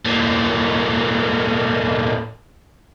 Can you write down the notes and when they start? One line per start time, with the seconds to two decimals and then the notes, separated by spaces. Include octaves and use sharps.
0.05 A2 A#3